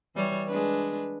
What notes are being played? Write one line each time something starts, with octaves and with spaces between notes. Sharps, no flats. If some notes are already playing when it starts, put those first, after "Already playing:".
E3 G3 C#5
G#3 D4 B4